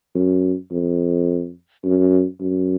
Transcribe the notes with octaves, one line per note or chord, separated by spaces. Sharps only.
F#2
F2
F#2
F#2